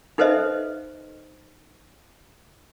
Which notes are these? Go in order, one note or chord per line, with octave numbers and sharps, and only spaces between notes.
D#4 A4 B4 C5 D#5 E5